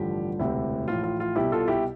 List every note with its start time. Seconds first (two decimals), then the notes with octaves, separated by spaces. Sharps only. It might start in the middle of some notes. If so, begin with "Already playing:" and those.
Already playing: A1 G2 D3 F3 G4
0.39 E1 D2 C3 E3 E4
0.88 A1 A2 F3 F4
1.03 F4
1.20 F4
1.36 C2 B2 E4 G4
1.52 F4 A4
1.68 E4 G4